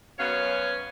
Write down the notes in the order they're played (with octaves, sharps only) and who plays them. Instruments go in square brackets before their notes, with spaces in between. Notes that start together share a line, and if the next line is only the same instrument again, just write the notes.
[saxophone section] F#2 B2 B3 C#4 C#5 F5